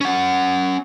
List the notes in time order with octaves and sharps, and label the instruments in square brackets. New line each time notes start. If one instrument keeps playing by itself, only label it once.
[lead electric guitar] C#4 F#5